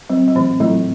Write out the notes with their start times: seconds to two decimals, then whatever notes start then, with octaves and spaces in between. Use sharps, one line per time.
0.10 F#3 C4
0.28 F#3
0.35 A2 E3
0.60 A2 F#3